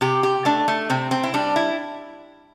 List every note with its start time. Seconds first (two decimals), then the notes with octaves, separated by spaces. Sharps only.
0.01 C3 G4
0.23 G4
0.45 A3 D4
0.68 A3
0.90 C3 C4
1.11 C4
1.23 E4
1.34 G3 D4
1.56 E4